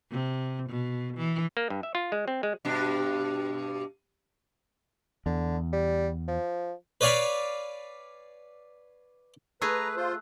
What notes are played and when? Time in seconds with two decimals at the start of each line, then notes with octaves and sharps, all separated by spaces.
0.11 C3
0.70 B2
1.17 E3
1.57 A#3
1.70 G2
1.83 E5
1.95 F4
2.12 G#3
2.28 C4
2.43 G#3
2.65 G2 B2 D4
5.26 E2 D3
5.72 G3
6.28 F3
7.01 B4 C#5 D5 F5 G#5 B5
9.62 A3 G#4 B4 A#5 E6 F#6
9.97 F4 C5